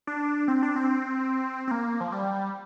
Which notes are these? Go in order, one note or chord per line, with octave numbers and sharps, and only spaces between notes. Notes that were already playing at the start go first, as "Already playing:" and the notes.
D4
C4
D4
C4
C4
A#3
F3
G3